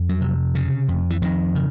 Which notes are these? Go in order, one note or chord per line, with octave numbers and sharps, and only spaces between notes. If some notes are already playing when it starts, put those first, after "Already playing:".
Already playing: F2
F#3
C3
C#3
F2
E3
F2 D#3
C#3